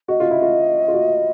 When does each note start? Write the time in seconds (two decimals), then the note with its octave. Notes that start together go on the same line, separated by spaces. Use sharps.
0.08 F#4 D#5
0.20 F4
0.31 E4
0.42 F4
0.88 F4
0.94 F#4